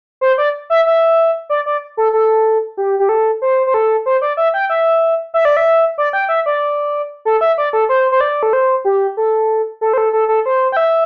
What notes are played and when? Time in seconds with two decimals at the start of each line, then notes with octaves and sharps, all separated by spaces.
0.21 C5
0.38 D5
0.70 E5
0.86 E5
1.50 D5
1.66 D5
1.97 A4
2.13 A4
2.77 G4
2.99 G4
3.09 A4
3.42 C5
3.67 C5
3.74 A4
4.06 C5
4.22 D5
4.37 E5
4.54 G5
4.70 E5
5.34 E5
5.45 D5
5.57 E5
5.98 D5
6.13 G5
6.29 E5
6.46 D5
7.25 A4
7.41 E5
7.58 D5
7.73 A4
7.89 C5
8.12 C5
8.21 D5
8.43 A4
8.53 C5
8.85 G4
9.17 A4
9.81 A4
9.93 C5
9.98 A4
10.13 A4
10.28 A4
10.46 C5
10.72 G5
10.77 E5